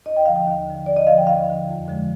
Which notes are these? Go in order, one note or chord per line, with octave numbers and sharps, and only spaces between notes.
D#2 D#5
G5
D3 F3 F5
G5
D#2 F5
D3 F3
D#2 D5
D#5
D3 F3 F5
G5
D#2 F5
D3 F3
F2
D3 F3 G#3